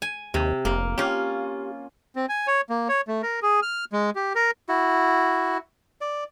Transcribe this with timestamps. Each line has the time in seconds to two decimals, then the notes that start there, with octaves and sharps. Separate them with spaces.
0.02 G#5
0.34 D#2 C3
0.65 F1 A#3
0.98 C#4 F4 G4
2.16 C4
2.29 G#5
2.47 C#5
2.70 A#3
2.88 C#5
3.08 A3
3.23 A#4
3.42 G#4
3.62 F6
3.93 G#3
4.15 G4
4.35 A#4
4.69 E4 F#4
6.01 D5